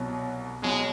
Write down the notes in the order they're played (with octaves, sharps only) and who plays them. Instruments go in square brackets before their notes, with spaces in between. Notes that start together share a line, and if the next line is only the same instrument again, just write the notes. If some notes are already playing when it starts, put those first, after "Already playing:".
Already playing: [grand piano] C2 B2 F#3
[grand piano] C2 B2 F#3 [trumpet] G#3